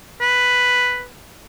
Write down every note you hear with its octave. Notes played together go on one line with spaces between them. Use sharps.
B4